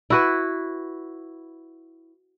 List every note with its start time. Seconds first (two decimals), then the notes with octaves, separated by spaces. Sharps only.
0.10 E4 F#4 B4